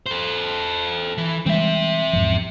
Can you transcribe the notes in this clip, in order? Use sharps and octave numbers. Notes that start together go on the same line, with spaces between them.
A4 C5
E3
E3 G3 G#3 C4 E5
E2 G#2 F3